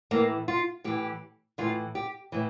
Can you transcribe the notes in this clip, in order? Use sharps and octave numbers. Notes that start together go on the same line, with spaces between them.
A2 E3 A#3
F4
A2 E3 G4
A2 E3 F4
G4
A2 E3